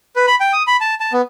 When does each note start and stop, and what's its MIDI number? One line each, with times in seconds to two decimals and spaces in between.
0.16 0.26 71
0.27 0.35 83
0.40 0.53 79
0.53 0.63 87
0.67 0.77 83
0.81 0.95 81
1.00 1.13 81
1.13 1.21 59